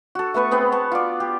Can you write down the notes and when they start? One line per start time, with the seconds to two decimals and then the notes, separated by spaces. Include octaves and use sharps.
0.15 F#4 A4
0.34 A3 B3 B4 C#6
0.51 B3 C4 G#4
0.72 A5 C#6
0.92 F4 D5
1.20 G4